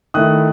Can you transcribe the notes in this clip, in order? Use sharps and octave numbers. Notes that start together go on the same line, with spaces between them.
D#3 A3 E4 D#6 F#6